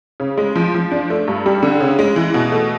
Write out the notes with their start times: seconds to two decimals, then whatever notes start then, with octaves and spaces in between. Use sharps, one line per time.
0.20 C#3
0.38 G#3
0.56 F3
0.74 F3
0.91 D4
1.10 A3
1.28 G2
1.46 G3
1.63 D3
1.80 C#3
1.99 G#3
2.16 E3
2.34 B2
2.52 A3